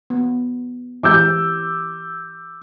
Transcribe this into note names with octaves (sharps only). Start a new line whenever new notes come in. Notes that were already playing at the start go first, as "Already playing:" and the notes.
B3
E3 C4 G4 D6 E6 G6